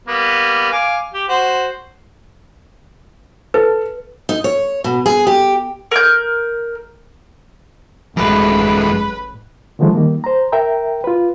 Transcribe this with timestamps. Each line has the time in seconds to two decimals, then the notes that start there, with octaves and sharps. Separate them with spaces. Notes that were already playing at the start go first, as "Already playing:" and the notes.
0.08 G3 A#3 B3
0.72 F5 G#5 D6
1.14 G4
1.28 F#4 C5
3.54 A4 B4
4.29 D#4
4.44 C#5
4.84 B2
5.06 G#4
5.27 G4
5.91 A#4 G6
8.17 A1 F#2 G#3 A3 B4
9.79 D3 D#3 F3 G#3 A3
9.95 D#3 G3 A#3
10.24 C5 A#5
10.52 A#4 E5 G5 A#5
11.04 F4 B4